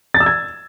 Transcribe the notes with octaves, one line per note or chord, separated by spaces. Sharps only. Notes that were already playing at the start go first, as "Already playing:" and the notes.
A6
E6
G#6